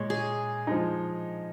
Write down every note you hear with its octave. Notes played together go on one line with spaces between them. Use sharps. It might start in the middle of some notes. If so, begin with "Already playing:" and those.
Already playing: A#2 G#3 C#5
G#4
F3 G#3 D#4